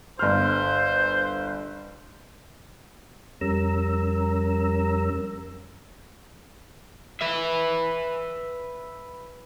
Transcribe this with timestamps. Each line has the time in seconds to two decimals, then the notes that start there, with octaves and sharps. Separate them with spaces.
0.19 G1 C5 F6
3.41 F2 G3 C#4 A#4 A#5 E6
7.21 B4 E5